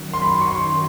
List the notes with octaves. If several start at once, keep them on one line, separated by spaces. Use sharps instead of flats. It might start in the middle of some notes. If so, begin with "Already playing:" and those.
Already playing: F#2 D#3 F#3
C6
B5
C6
C#6
C6